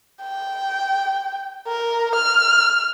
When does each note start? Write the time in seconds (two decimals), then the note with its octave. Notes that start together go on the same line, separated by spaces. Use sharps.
0.22 G5
1.68 A#4
2.15 F6